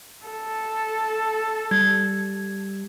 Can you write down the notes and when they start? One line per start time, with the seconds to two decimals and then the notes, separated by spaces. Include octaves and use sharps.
0.27 A4
1.71 G3 G#6